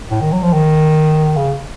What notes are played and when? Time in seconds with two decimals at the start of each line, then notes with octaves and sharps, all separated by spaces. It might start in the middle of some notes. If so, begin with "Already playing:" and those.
0.11 A2
0.21 D#3
0.32 F#3
0.43 F3
0.53 D#3
1.37 C#3